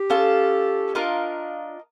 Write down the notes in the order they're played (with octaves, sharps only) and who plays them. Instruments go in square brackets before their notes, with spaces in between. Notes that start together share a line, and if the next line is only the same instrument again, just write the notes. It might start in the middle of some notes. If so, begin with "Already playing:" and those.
Already playing: [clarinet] G4
[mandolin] C#4 F4 A4
D4 F4 A#4 D#5